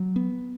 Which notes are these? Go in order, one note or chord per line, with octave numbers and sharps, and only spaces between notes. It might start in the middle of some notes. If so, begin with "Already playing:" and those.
Already playing: F#3
B3